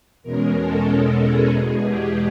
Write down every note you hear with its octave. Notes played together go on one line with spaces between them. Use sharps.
E2 B2 G#3 C#4 A#4
A4
A4
G#4
E2 B2 G#3
G4